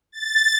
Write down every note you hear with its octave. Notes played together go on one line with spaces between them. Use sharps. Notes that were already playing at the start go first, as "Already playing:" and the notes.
A6